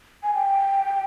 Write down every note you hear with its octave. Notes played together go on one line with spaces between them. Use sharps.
G#5
G5